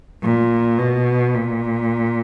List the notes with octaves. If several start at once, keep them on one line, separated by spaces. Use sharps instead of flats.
A#2
B2
A#2